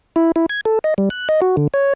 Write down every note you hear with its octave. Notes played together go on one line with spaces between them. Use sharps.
E4
E4
G#6
A4
D#5
G3
F#6
D#5
F#4
D3
C#5